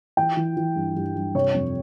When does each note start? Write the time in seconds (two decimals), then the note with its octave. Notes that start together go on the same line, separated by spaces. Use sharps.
0.17 E3 G5
0.37 E3
0.57 E3
0.76 G2
0.96 G2
1.15 G2
1.34 C3 C#5
1.55 F2